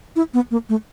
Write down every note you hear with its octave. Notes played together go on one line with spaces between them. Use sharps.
E4
B3
A#3
A3